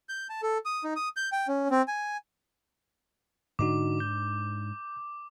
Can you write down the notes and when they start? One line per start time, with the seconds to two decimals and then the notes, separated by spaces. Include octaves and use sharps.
0.09 G6
0.29 A5
0.42 A4
0.65 D#6
0.84 D#4
0.96 D#6
1.16 G6
1.32 G5
1.48 C#4
1.71 C4
1.88 G#5
3.59 G#2 D3 D4 D#4 F#4 D6
4.00 G6